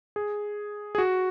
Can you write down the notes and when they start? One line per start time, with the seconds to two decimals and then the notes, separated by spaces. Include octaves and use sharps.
0.16 G#4
0.95 G#4
0.98 F#4